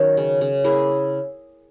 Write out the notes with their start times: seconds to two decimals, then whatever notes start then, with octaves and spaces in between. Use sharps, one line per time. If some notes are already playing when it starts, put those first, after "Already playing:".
Already playing: D#3 F#3 C#4 A#4
0.17 C#3
0.41 C#3
0.64 A#3 E4 G#4